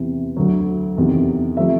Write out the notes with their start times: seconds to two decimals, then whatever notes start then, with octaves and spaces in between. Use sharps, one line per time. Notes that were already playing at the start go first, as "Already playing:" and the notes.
Already playing: E2 C3 E3
0.37 D2 D3 F#3
0.97 E2 C3 D#3
1.57 C3 F3 A3 E5